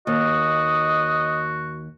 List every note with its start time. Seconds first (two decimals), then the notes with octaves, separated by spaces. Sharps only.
0.07 D#2 F#4 D#5